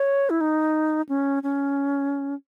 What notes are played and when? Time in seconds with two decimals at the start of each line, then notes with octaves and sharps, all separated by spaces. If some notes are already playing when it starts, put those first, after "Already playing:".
Already playing: C#5
0.30 E4
0.41 D#4
1.09 C#4
1.43 C#4